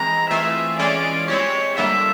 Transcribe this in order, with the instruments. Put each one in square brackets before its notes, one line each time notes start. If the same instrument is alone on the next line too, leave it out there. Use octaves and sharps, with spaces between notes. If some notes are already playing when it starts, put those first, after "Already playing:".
Already playing: [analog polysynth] E3 G#3 C4 [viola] A#5
[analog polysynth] E3 A3 C4 F4 G#4 [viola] E5
[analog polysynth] E3 G#3 C#4 F4 G#4 [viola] D5
[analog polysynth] G#3 C4 E4 G4 [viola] C#5
[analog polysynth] D3 G3 A#3 D4 F4 [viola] E5